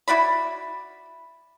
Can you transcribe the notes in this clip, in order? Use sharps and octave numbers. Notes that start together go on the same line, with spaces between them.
E4 F#4 D5 B5